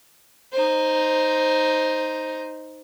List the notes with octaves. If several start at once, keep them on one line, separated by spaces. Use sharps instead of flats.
D#4 C5